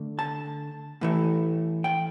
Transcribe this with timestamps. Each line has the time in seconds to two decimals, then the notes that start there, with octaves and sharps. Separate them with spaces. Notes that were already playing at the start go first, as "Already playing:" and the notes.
Already playing: D3 A3
0.19 A5
1.01 A2 E3 A3
1.84 G5